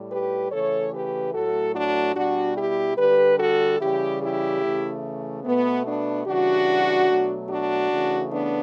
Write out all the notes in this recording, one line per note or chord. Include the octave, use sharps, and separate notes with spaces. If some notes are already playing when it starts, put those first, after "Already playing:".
Already playing: A2 G3
G4 B4
C#3 E3 A3 A4 C#5
G4 B4
A2 F#3 A3 F#4 A4
D4 F#4
B2 G3 D4 F#4
E4 G4
D3 G3 G4 B4
F#4 A4
C#3 E3 G3 E4 G4
E4 G4
C#3 E3 A3
B2 A3 B3
B3 D4
C#3 E3 G3 D4 F#4
B2 F#3 A3
D4 F#4
C#3 E3 A3
B3 D4